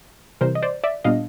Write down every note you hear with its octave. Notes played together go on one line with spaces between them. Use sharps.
C3 E3 G3 A#4 C5
D#5
C5 D5
D5 E5
A#2 G3 B3 D4 D#5 F5